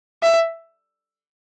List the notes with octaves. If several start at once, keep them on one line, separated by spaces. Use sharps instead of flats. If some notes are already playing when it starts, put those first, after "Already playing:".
E5